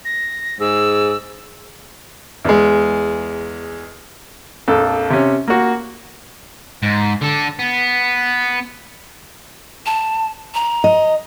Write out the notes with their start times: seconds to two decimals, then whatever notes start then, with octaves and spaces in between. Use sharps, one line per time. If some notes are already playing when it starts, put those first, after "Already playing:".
0.05 A#6
0.60 G#2 G#4 E6
2.45 E2 G#3
4.68 A#1 F2 A4
5.10 C3 C#4
5.48 A#3 F#4
6.83 G#2
7.21 D3 A4
7.59 B3
9.86 A5
10.54 A#5
10.84 D#5